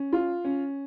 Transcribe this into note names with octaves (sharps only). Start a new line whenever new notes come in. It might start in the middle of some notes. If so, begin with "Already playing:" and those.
Already playing: C#4
F4
C#4